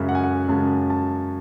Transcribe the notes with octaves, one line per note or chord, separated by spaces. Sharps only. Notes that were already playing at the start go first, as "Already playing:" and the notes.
Already playing: F#2 C#3 G#3 E5
F#5
G#5
F#5
F#2 C#3 G#3 A5
A5